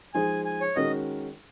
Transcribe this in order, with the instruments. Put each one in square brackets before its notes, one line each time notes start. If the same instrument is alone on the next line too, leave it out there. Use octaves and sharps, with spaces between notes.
[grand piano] F3 G#3 D#4 G#4 C5 [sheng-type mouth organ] G#5
[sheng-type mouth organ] G#5
C#5
[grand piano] D#3 G#3 C#4 F#4 A#4 [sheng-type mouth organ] D#5